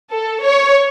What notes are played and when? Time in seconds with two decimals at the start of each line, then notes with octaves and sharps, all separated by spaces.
0.12 A4
0.44 C#5